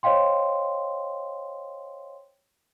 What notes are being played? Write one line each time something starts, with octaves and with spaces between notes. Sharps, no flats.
C5 C#5 D#5 F5 G5 C6